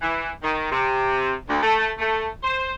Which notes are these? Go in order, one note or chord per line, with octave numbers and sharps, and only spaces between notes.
E3
D#3
C3
D2
A3
A3
C5